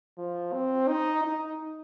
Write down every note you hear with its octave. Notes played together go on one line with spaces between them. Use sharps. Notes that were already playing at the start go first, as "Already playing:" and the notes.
F3
C4
D#4
D#4